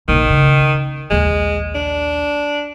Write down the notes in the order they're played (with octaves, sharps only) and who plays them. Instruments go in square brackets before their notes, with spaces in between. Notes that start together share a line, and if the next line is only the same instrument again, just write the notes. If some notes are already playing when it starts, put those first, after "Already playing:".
[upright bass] A#1 C3 [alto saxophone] D#3
[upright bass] C#3
[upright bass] A#1 D#2 [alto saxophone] G#3
[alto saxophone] D4